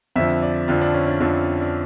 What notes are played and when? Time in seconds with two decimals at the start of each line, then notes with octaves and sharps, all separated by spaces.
0.16 F2 D3 F3 E5
0.43 D5
0.68 F2 D3 F3 F4
0.82 D4
0.93 C#4
1.07 D4
1.20 F2 D3 F3 D4
1.61 D4